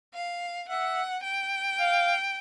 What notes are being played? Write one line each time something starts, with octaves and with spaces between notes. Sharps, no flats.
F5
E5 F#5
G5
F5